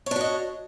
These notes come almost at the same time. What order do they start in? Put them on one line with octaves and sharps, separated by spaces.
C#5 D4 F#4 D#5